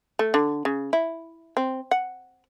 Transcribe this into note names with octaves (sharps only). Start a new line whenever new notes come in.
A3
D3
C#3
E4
C4
F#5